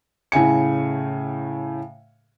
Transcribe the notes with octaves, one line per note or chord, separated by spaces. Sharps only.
A2 C#3 G#5 C#7